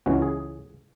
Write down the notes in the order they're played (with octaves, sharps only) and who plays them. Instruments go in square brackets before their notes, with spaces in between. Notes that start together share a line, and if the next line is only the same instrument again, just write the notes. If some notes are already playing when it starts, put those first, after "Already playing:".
[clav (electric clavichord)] C#2 C#3 E3 G#3 C#4 F#4
G#4